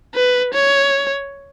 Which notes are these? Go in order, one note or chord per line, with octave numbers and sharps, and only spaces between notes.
B4
C#5